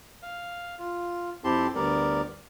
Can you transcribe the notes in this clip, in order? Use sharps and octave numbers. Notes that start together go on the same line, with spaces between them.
F5
F4
F2 C4 E4 G4 A5 C6
D2 G3 B3 A#4 D5